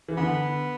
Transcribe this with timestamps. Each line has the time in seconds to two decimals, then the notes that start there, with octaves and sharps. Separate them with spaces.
0.08 E3
0.17 D3 B3